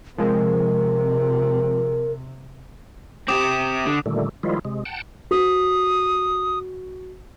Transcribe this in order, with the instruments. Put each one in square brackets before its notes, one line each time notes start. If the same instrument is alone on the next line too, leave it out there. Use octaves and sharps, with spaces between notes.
[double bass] C3 [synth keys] F3 G#3 C4 [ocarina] A#4
[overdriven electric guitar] C4 G4 [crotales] D6 D#6 E7
[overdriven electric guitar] D3
[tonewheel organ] A#2 D3 D#3 G3 A3
D#3 F3 G3 G#3 E4 F4
C3 G#3
F#5 G5 A5
[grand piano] F#4 [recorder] D#6